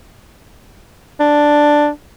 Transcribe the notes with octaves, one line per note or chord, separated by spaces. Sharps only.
D4